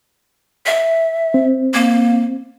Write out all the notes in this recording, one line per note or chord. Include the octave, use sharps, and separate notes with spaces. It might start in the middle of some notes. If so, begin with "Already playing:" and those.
E5
C4
A#3